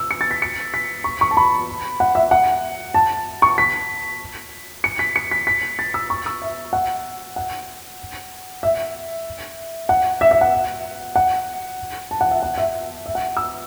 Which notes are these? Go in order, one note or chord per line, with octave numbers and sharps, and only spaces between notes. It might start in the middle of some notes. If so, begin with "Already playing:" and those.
Already playing: E6
C#7
A6
B6
C#7
B6
C#6
C#6
A5
B5
F#5
E5
F#5
A5
C#6
B6
C#7
B6
C#7
B6
B6
A6
E6
C#6
E6
E5
F#5
F#5
E5
F#5
E5
E5
F#5
F#5
A5
F#5
E5
F#5
E5
E5
F#5
E6